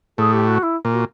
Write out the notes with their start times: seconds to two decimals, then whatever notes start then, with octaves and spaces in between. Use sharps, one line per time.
0.18 A2 G#4
0.33 G4
0.47 F#4
0.63 E4
0.85 A#2
0.92 F#4